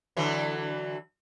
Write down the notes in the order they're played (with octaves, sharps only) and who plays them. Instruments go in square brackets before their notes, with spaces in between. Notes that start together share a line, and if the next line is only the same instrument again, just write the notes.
[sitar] D3 E3 F#3